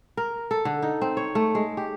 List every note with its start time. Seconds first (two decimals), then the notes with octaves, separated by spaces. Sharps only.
0.17 A#4
0.51 A4
0.65 D3
0.82 D#4
1.01 C4
1.17 C#5
1.35 A3
1.55 G#3
1.77 G4